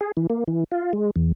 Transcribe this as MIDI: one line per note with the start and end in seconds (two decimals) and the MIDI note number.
0.01 0.12 68
0.17 0.27 52
0.30 0.44 58
0.48 0.64 52
0.72 0.93 65
0.93 1.11 56
1.16 1.32 40